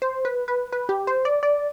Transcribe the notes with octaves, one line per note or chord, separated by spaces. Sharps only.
C5
B4
B4
B4
G4
C5
D5
D5